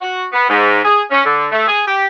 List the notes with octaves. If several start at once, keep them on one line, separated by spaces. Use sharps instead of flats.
F#4
B3
G#2
G#4
C#4
D3
A3
G#4
G4